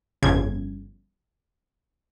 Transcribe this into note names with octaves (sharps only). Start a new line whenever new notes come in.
G1 F2 C#3 G#6